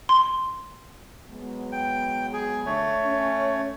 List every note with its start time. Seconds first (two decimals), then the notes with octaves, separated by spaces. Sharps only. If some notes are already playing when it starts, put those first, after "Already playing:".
0.09 C6
1.30 F#3 G#3 B3
1.72 G5
2.33 G#4
2.66 D3 A3 C#5
3.04 C#4